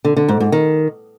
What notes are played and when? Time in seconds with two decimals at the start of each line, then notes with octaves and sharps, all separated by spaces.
0.05 D3
0.16 D3
0.28 G#2
0.40 G#2
0.52 D#3